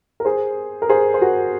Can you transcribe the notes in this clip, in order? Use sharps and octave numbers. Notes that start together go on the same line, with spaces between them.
A#4
G#4 C5
A#4
G#4 C5
C5
F#4 A#4